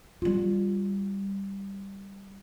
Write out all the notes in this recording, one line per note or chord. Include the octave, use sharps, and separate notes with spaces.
G3 F4